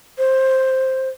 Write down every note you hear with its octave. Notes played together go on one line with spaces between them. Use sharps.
C5